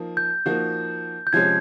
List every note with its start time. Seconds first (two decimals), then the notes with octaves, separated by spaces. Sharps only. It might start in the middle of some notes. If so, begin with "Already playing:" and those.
Already playing: F3 A#3 D#4
0.17 G6
0.46 F3 A#3 D#4 F#4
1.27 G6
1.33 C3 F3 G#3 C#4 G#6